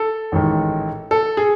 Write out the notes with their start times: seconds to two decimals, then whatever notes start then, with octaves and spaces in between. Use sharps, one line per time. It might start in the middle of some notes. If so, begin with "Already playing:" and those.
Already playing: A4
0.32 A1 G#2 D#3
1.11 A4
1.37 G#4